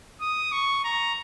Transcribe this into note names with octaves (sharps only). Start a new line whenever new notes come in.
D#6
C#6
A#5